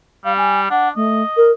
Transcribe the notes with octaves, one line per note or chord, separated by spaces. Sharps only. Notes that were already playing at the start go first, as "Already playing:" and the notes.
G3 F5
G#5
D4 F#5
A3 D#5
A#4